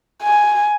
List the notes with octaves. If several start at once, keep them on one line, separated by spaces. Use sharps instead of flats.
G#5